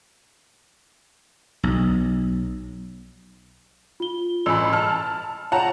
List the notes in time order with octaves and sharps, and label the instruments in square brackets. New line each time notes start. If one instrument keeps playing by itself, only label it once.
[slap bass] B1
[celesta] F4 G7
[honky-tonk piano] A1 B5 [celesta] G#5 E6
[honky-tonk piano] A5 F6
[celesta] F4 C#5 [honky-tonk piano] F#5 A5 A#5